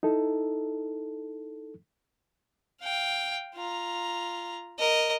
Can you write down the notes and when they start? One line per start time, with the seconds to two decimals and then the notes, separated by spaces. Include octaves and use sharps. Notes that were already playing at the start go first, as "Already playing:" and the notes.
0.03 D#4 E4 A4
2.81 F5 G5
3.55 F4 A#5
4.79 A#4 D#5